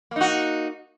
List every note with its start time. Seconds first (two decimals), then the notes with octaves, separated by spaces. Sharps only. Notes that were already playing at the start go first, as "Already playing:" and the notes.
0.11 A#3
0.16 D#4
0.21 F#4